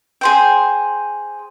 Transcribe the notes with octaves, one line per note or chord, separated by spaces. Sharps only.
G#4 C5 G5